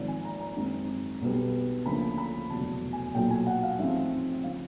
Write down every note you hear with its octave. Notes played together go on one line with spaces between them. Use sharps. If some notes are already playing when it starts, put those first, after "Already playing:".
Already playing: G#1 G#2 F3
G#5
A#5
A#5
F#2 D#3 G#3 C4 A#5
B1 B2 G3 B3
D2 C#3 F3 A#3 D4 B5
B5
F1 E2 B2 F#3 A5
G#5
B1 A#2 F#3 G5
G#5
F#5
F5
A1 G#2 F3 G#3 C4 E5
C#3 F3 F5